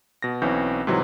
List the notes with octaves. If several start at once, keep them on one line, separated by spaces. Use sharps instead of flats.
B2 A#6
B1 E3 C4 C#4 G6
G#2 C3 E3 F#3